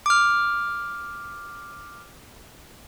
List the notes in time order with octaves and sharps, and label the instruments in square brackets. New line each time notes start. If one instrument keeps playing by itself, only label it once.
[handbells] D6 F6